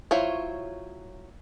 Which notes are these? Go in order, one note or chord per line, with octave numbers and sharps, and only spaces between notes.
F#3 E4 F4 C5 C#5